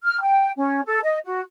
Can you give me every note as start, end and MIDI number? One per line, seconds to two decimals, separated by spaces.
0.03 0.20 89
0.21 0.51 79
0.56 0.81 61
0.86 0.99 69
1.03 1.18 75
1.25 1.41 66